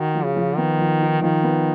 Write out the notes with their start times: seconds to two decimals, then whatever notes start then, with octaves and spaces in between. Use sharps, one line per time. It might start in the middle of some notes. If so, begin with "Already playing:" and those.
Already playing: D#3 F#4
0.15 F3
0.25 C#3
0.36 F3
0.57 D#3 B3
0.79 F3
1.01 D#4
1.22 D#3 F3
1.43 B3